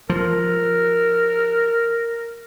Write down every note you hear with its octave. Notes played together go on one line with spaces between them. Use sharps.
F3 A#4